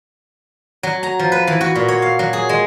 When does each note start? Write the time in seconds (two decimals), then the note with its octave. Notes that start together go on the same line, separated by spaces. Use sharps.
0.83 F#3
1.03 A#5
1.19 F3
1.32 B4
1.47 E3
1.61 F#4
1.75 A#2
1.88 C#5
2.02 F5
2.19 F#3
2.33 G#4
2.49 G#3